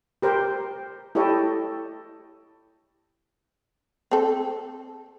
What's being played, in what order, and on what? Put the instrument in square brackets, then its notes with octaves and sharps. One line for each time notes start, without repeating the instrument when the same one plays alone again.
[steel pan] G4 A#4 C5
E4 G4 A4 C#5 D#5
[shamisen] C4 A4